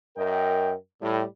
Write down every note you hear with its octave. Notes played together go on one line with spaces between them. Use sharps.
F#2 A#4 D#5 G5
A2 G3